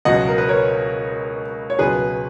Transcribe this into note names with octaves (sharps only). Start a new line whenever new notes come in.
C#2 B2 F#3 D#5 F#5
A#4
B4
A#4 C#5
C#5
C#2 B2 F#3 G#4 B4